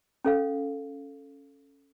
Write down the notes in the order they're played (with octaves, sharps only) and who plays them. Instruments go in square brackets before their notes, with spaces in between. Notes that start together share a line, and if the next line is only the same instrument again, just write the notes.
[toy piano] C#4 A4 F5